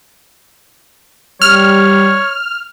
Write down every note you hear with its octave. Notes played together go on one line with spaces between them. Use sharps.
G3 C#5 F6